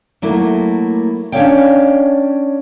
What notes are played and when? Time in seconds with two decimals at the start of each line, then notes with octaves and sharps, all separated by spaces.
0.22 F#3 A3 A#3 E4
1.32 C#4 D4 A4 C#5 F5 G5